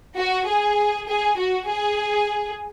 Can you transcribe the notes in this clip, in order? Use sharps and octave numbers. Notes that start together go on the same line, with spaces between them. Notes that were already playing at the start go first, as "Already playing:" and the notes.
F#4
G#4
G#4
F#4
G#4